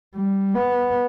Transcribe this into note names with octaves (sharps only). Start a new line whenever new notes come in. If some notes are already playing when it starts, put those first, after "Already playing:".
G3
B3